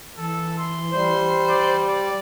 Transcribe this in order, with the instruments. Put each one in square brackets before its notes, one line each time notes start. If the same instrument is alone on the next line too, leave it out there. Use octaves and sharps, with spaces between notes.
[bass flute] E3 [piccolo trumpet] A4
[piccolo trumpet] C6
[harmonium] G3 [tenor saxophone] C5
[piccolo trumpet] D5
D5